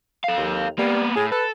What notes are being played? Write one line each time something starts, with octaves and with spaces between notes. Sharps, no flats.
A4 F5
D#2
G3 A#3 B3
A2 G#4
A4 B4